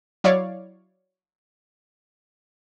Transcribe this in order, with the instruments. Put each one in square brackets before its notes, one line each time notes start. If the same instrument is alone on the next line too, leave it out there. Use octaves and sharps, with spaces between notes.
[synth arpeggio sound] F#3 E4 C#5 D5 F5